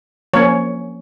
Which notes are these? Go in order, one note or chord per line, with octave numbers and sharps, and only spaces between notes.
F3 A#3 C#4 C#5